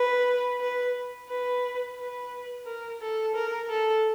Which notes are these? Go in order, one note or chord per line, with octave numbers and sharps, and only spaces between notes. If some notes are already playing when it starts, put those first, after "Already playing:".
Already playing: B4
B4
B4
B4
A#4
A4
A#4
A4